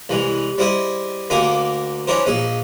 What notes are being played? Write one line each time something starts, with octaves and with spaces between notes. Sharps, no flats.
C2 E3 G#3
G3 C4 E4 G#4 D#5 E5
D2 A#3 D#4 G#4 B5 D6
C#4 D4 E4 A#4 C5
A#1 D#4 G#4